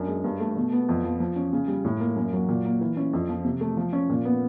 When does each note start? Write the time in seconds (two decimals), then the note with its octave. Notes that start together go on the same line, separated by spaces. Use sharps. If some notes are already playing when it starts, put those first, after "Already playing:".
Already playing: F#2 D4
0.08 G#3
0.24 G2
0.40 A3
0.56 B2
0.73 B3
0.89 F2
1.04 F3
1.20 F3
1.36 C#4
1.53 C#3
1.68 G3
1.85 A2
2.00 A#3
2.16 F#2
2.33 F#3
2.49 A#2
2.65 A#3
2.81 E3
2.97 C#4
3.13 F2
3.29 F3
3.44 C3
3.61 A3
3.77 F3
3.93 C#4
4.10 A#2
4.25 B3